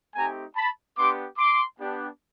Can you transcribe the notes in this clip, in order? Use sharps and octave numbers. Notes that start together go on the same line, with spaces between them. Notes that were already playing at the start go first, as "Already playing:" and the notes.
A3 C4 D#4 G4 G#5 A#5
A5 B5
B3 D4 G4 C6 D6
C6 D6
B3 D4 G4